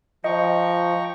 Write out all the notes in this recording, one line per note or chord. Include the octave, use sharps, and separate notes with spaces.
F3 D#5 G5 A#5 C#6